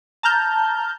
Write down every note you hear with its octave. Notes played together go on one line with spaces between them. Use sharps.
A5 A#5 F6 G6